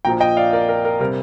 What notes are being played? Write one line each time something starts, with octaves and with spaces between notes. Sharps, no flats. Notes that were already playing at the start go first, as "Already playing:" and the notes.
A#1 A#2 F3 G5 A#5
D#5 G5
D5 F5
A#4 D5
A#4
A#4
C3 G3 A#4